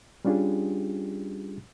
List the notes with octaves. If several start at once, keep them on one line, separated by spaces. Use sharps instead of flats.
G3 C#4 D4 F4 G4 G#4